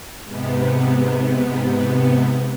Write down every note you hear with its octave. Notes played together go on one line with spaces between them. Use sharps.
G#2 C3 B3